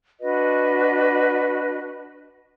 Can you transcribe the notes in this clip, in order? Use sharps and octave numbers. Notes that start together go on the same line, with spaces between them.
D4 F#4 B4 D#5